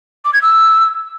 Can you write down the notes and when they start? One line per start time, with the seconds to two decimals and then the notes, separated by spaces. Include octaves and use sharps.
0.24 D6
0.33 G#6
0.42 E6